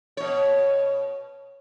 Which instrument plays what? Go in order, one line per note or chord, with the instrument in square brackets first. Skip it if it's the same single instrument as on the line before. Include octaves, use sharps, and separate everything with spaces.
[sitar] B2 C#5